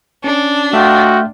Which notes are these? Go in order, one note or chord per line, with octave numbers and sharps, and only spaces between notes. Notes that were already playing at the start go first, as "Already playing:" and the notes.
C#4 D4
A3 F4 F#4 D#5 E5 G5